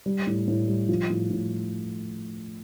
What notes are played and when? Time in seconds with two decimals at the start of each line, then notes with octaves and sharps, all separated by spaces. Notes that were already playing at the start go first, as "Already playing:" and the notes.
0.06 G3
0.27 A2
0.48 A2
0.68 G3
0.89 F3
1.10 A2
1.30 A2